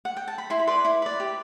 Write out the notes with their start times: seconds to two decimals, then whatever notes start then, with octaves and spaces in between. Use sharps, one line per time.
0.05 F#5
0.17 G5
0.28 A5
0.38 B5
0.50 E4 C6
0.59 B5
0.67 B4 D5 C6
0.85 E4
1.02 B4 D5
1.20 G4